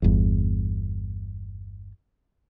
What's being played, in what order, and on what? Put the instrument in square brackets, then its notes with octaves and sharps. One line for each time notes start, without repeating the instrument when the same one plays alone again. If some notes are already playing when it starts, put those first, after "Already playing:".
[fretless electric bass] G1 E2